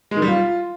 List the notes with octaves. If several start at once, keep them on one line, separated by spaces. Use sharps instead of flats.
G#3
D#3
G3
F4